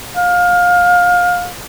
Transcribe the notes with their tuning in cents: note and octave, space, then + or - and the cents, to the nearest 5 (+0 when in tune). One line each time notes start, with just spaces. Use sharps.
F5 +25